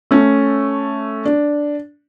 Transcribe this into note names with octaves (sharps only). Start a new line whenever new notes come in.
A3 C#4
D4